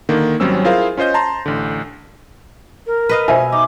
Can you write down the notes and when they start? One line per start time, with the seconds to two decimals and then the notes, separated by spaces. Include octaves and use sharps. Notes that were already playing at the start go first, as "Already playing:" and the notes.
0.09 D3 D#3 A#3
0.40 G#1 F#3 G3 C4 C#4 E6
0.64 E4 F4 G#4 A#4 C5 F5
0.97 C#4 F4 C5 D#5 G6
1.14 A5 A#5 C6
1.46 A1 D3
2.87 A#4
3.09 B4 D#5 F5
3.28 B2 C5 E5 G#5
3.52 D#4 D6